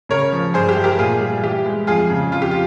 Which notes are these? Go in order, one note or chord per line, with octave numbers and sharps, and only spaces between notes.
C#3 A#4 C#5
F3
G2 G#4 C5
G4
E3
G4 A#4
A#2 F4 G#4
G3
E3 G4
G#3
F2 F4 G#4
C#3
F2 F4
G4
F4